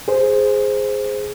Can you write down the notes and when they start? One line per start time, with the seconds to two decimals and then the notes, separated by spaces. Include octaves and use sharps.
0.08 G#4 C5